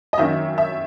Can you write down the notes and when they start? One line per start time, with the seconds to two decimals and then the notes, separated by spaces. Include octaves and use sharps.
0.13 D#5
0.18 F#2 D#3 A#3 C#4 E5
0.58 E5